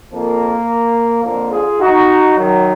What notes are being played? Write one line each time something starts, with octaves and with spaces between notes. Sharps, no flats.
F2 F3 A#3
F2 D3 F3 A#3
F4 G#4
D#4 F#4
F#2 D#3 F#3